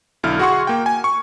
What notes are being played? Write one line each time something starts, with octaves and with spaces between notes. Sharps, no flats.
B1 D3 E4 F6
F#4 G#4 F#5 C6 C#6
A#3 G5
G#5
C#6